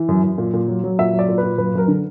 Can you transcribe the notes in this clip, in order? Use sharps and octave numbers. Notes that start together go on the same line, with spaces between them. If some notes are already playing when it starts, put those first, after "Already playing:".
Already playing: E3
F#2
F#2
A#2
A#2
F#3
F#3
A#2 E5
F#3
D5
A#2
B4
A#2
F#2 B4
F#2 A#4
D3